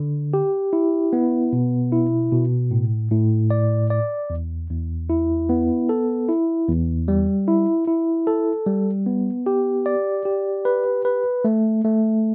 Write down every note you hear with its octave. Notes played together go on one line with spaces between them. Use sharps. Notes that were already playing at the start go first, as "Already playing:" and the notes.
Already playing: D3
G4
E4
B3
B2
E4
B2
A2
A2
D5
D5
E2
E2
E4
B3
A4
E4
E2
G3
E4
E4
A4
G3
B3
G4
D5
G4
B4
B4
A3
A3